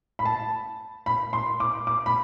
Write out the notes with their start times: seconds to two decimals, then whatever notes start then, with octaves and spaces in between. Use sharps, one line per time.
0.19 B5
0.25 A5
1.06 B5
1.33 C6
1.60 D6
1.87 D6
2.06 B5